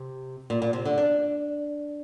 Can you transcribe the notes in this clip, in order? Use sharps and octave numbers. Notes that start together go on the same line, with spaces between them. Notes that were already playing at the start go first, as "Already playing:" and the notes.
Already playing: C3
A#2
A#2
C3
D3
D4